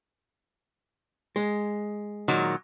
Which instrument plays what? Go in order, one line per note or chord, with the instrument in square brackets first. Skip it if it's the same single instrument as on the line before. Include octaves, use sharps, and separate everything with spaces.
[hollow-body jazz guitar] G#3
[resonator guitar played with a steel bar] A#2 D#3 F#3